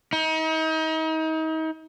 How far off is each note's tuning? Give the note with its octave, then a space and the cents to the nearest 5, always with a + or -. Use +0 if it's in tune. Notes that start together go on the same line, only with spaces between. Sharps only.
D#4 +35